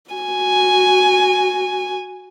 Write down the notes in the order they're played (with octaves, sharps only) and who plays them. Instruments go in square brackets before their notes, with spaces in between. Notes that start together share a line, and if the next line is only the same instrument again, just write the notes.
[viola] F#4 G#5